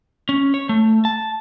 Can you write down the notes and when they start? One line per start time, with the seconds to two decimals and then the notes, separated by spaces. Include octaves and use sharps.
0.29 C#4
0.54 C#5
0.69 A3
1.05 A5